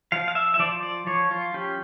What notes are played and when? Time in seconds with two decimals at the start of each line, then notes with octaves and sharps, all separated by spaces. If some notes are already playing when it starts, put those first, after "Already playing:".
0.12 F3 F5
0.28 F5
0.35 E5
0.54 E5
0.59 F3 D5
0.83 D5
1.07 F3 C#5
1.31 F4
1.54 C#4 G4